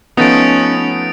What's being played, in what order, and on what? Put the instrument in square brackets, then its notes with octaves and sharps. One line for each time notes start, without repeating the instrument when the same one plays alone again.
[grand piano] F3 A3 D#4 [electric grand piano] B3 [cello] C#4 [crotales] D#6 A6 D7